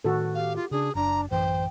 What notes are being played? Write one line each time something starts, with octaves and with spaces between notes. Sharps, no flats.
A2 D#3 F#4 A4
G4 F5
F4
C#3 D4 G#4
F#1 D4 A#5
A1 F#2 E3 C5 G5